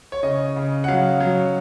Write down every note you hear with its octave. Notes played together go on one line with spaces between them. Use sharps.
C#5
C#3 D#5
C#3
F#5
F#3 F5
F#3